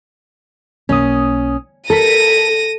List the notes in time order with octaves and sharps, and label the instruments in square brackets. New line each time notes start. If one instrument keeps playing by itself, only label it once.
[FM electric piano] B1 A#3 D#6 [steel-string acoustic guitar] C#4
[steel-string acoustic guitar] A4 [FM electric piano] A#4 B6 [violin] A#6 D#7